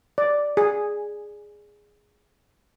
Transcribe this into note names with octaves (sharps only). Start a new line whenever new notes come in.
D5
G#4